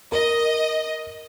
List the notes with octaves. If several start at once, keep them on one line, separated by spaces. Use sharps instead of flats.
A#4 D#5